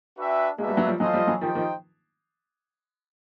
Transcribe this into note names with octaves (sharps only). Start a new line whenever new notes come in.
D4 F#4 B4 E5 G5
G#3 A#3 D4 F#4 B4 E5
G3
F#3
F3 G3
E3 F#3 F4 A4 C5 D#5
F3 G3
E3 F#3
D#3 F3 D#4 G4 C5 D#5 G5
D#3 F3